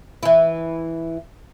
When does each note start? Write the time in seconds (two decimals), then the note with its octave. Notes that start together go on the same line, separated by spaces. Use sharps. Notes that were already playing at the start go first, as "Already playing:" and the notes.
0.23 E3 E4